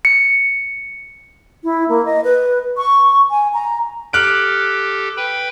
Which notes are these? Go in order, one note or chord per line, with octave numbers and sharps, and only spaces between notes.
C#7
E4
A#3
D#5
B4
C#6
G#5
A#5
G4 A4 F6 F#6 D7
B4 G5 B5